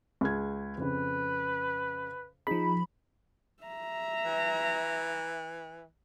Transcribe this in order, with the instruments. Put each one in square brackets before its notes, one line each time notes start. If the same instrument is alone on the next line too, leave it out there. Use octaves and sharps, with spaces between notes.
[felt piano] C#2 G#4 G#6
[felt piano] F2 C#3 [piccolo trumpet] B4
[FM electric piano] F3 B5 [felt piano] D#4 G#4
[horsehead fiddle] E5 A#5
[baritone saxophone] E3